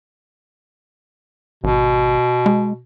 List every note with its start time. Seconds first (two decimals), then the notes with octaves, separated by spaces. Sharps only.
1.64 G#1 B2
2.46 G#3